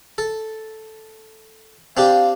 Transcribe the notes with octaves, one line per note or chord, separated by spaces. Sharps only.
A4
C4 D4 G4 F5